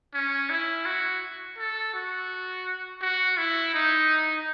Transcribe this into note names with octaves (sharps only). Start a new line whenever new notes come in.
C#4
E4
F#4
A4
F#4
F#4
E4
D#4